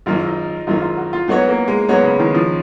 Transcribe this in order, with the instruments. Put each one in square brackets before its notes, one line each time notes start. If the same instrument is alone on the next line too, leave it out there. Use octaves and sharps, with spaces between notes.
[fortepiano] G#1 F#2 D#3 [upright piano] F4
[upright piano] D#4
[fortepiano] G#1 F#2 D#3 [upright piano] F4
[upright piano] F4
F#4
F4
[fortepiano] G#2 F#3 B3 F#4 C#5
[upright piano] A#3
G#3
[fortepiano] G#2 F#3 B3 F#4 C#5
[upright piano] C#3
D#3
F3